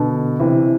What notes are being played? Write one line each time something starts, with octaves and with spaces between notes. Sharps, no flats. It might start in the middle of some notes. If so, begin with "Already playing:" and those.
Already playing: B2 D3
C3 E3